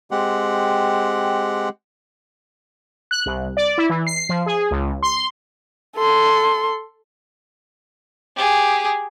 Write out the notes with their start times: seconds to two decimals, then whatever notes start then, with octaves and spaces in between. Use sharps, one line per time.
0.11 G#3 C4 G4 F#5
3.11 F#6
3.26 C2
3.57 D5
3.78 E4
3.89 E3
4.07 C7
4.29 F3
4.46 G#4
4.71 C#2
5.03 C6
5.97 A4 C6
8.36 G4 G#4